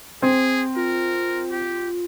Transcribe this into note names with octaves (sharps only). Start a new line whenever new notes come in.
C4 G#4
F4 A#4
G4